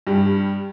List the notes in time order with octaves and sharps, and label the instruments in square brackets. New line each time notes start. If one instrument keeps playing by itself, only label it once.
[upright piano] G2 G3